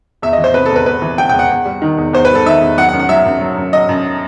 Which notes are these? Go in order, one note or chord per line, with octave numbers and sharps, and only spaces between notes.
E2 E5
D#5
E3
C5
C3 B4
E2 A4
B4
E2 B4
E3
C3 G5
E2 G5
F#5
E2
G3
D#3
E2
E2 C5
B4
G3 A4
D#3 E5
E2
F#3 F#5
F#5
F#2
F#5
F#3 E5
F#2
F#3
F#2
F#3 D#5
F#2